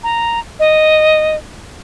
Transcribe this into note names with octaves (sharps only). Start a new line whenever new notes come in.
A#5
D#5